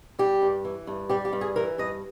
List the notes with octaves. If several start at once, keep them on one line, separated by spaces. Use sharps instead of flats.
G3 G4
G2
E3
G2
G3 G4
G4
G2
G#4
E3 A#4
G2 D#5